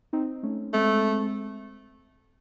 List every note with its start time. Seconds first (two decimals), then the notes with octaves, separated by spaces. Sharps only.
0.13 C4 D#4
0.43 A3 C#4
0.73 G#3 A3 C4